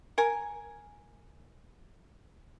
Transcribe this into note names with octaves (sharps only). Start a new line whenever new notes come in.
A#4 G#5